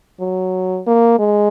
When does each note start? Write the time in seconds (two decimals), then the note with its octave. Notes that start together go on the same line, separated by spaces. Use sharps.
0.20 F#3
0.87 A#3
1.19 G#3